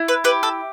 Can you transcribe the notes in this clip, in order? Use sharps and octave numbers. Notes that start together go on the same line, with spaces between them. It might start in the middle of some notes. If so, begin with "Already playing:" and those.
Already playing: E4
B4
G4 B4
A4